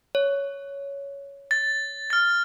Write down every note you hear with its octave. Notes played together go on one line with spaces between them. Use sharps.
C#5
A6
F6 A6